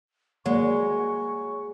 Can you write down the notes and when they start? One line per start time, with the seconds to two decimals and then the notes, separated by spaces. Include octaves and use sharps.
0.46 F#3 G#3 A#3 D5 C#6